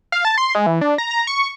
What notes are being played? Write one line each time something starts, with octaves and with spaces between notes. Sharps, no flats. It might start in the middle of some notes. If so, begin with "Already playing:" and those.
F5
A5
C6
G#3
E3
D4
A#5
A#5
C#6